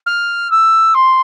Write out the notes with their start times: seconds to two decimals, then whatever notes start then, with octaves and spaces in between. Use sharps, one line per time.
0.06 F6
0.51 E6
0.94 C6